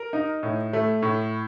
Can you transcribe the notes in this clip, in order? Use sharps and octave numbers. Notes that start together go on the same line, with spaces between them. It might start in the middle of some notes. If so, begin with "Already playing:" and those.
Already playing: A#4
D#4
A2
A3
A2